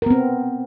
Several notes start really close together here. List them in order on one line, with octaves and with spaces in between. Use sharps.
A#4 B3 C4